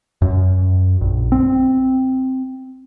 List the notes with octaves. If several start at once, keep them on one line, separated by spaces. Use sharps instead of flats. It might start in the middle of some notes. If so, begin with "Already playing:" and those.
F#2
A#1
C4